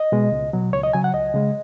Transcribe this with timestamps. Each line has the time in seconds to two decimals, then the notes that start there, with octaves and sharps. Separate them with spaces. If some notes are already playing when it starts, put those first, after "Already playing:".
Already playing: D#5
0.12 B2 G#3
0.32 C#2
0.53 B2 F#3
0.73 C#2 C#5
0.83 D#5
0.93 C#3 F#3 G#5
1.04 F#5
1.14 C#2 D#5
1.34 C#3 G#3